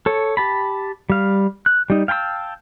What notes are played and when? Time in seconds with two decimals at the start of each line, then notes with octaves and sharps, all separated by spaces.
0.06 A4 C#5
0.37 G4 A5 B5
1.10 G3 F5
1.66 F#6
1.90 G3 D#4
2.08 F5 G5 A5 B5 E6